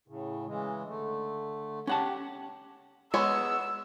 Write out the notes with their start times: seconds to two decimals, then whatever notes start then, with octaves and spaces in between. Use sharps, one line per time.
0.08 A2 C#3
0.47 C#3 E3 G#3
0.88 D3 A3
1.87 C#4 G4 F#5 A5
3.14 G#3 B3 C#5 E6